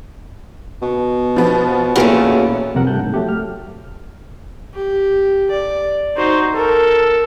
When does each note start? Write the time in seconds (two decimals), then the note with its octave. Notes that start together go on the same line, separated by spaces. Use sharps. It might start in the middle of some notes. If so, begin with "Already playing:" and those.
0.82 B2
1.36 F3 B3
1.96 E2 A#2 A3 B3 C#4 F#4
2.75 C2 F2 C3 A#4 F#5
2.87 G2 A3 A5 F#6 G6
3.01 G#2
3.14 F#3 A3 G4
3.29 F6
4.74 G4
5.50 D5
6.17 D#4 F#4 C5
6.55 A4 A#4